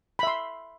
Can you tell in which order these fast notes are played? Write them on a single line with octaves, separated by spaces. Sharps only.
B5 E5 C6